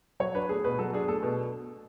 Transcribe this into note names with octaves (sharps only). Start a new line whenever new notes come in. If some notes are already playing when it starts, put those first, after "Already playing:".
F#3 C#5
D4 B4
A3 G#4
B2 B4
F#3 A4
D4 G#4
A3 A4
B2